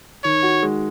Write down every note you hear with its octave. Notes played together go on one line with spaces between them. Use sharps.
D#3 C#5
F#4
G#3